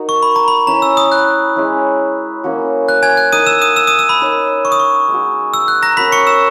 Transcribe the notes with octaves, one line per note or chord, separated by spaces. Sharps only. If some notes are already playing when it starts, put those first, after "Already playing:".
Already playing: D#4 F#4 A#4
C#6
B5
A#5
B5
C#4 E4 B4 A#5
E6
D#6
F#6
G#3 C#4 E4
A#3 C#4 F#4
F#6
G#5 G#6
F#6
D#4 A#4 E5 D#6 D#7
E6 E7
D#6 D#7
E6 E7
D#6 D#7
E6
B5
D#4 A#4 C#5 E5
C#6
D#6
C#6
G#3 D#4 F#4
E6
F#6
A#5 A#6
C#4 F#4 A#4 B5 B6
C#6 C#7
E6 E7